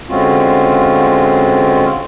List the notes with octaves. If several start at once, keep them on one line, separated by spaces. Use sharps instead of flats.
D3 G#3 C4 C#4 F4 F#4